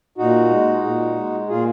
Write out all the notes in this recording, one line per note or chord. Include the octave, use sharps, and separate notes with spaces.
A#2 D#4 F#4
G#3
A#2
G#3
A#2 F4 G#4